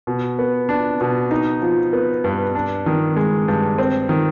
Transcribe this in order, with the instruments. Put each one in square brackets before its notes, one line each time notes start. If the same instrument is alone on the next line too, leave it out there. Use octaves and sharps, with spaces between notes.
[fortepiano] B2
B3
D4
B2
D#4
F3
B3
G2
D4
D#3
G#3
G2
C4
D#3